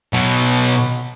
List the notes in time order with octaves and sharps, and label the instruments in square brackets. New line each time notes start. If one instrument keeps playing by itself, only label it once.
[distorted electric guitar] B2 F#3